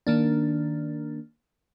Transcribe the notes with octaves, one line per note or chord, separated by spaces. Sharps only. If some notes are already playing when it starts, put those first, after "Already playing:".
D#3 A#3 D4